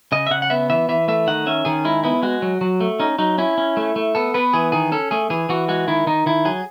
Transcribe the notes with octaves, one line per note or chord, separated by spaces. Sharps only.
C#3 D#5
E5
C#3 F#5
F#5
B3 E5
E3 E5
E3 E5
A3 E5
D#3 F#5
C#4 E5
D#3 G#4
G#3 E4
B3 E4
G#3 F#4
F#3
F#3
A3
C#4 D#4
F#3 D#4
C#4 E4
C#4
A3
A3
B3 A4
B3 B4
E3 G#4
D#3 G#4
C#4 A4
A3 G#4
E3 G#4
E3 F#4
G#3 F#4
D#3 E4
D#3 D#4
D#3 E4
F#3 G#4